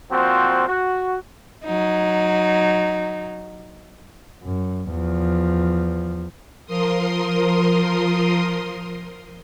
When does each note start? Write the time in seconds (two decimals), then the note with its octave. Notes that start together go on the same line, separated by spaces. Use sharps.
0.11 A#2 F3 C4 F#4
0.69 F#4
1.64 F#3 D#4
4.43 F#2
4.91 E2 F3
6.66 F3 A#4 C6 D#6